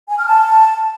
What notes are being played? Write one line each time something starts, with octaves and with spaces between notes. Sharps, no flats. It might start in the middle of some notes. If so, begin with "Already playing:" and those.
G#5
F6
A5